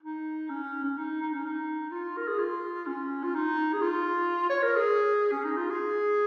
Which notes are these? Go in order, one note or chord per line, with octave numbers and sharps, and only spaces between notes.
D#4
C#4
C#4
D#4
D#4
C#4
D#4
F4
A#4
G#4
F4
C#4
F4
D#4
G#4
F4
C#5
A#4
G#4
C#4
D#4
F4
G#4